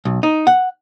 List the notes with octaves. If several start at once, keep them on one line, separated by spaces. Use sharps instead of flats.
B1
D#4
F#5